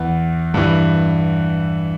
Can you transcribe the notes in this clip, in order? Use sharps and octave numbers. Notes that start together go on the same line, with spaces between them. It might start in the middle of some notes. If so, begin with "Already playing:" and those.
Already playing: E2 E3
G2 E3